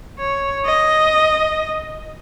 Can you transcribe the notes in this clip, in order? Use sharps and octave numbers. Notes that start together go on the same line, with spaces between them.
C#5
D#5